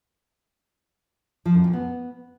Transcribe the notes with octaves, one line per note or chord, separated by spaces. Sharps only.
F3
F#2
A#2
B3